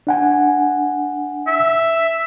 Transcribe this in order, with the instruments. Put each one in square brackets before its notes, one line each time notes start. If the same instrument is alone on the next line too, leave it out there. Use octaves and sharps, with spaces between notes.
[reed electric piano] D4 F#5 G#5
[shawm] E5